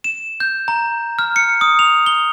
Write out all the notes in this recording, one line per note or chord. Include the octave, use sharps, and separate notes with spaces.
E7
G6
A#5
F6
C#7
D#6
F7
G7